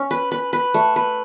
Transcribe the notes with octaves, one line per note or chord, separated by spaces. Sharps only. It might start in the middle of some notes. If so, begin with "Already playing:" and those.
Already playing: C#4
B4
B4
B4
A3
B4